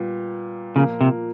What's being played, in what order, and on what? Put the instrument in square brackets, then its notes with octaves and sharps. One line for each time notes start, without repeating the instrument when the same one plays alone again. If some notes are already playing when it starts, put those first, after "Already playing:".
Already playing: [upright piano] A#2 G3 B3
[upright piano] A#2 F3 A#3 [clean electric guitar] C#3
[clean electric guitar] C3